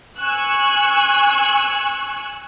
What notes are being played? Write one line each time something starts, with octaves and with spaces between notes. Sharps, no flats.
G#5 C#6 E6 F#6